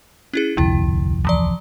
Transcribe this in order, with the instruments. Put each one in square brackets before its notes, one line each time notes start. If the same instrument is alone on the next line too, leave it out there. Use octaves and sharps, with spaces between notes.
[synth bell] C#4 E4 G#4
[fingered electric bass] D1 C2 F2 [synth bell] D3 E4
[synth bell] E3 F3 D5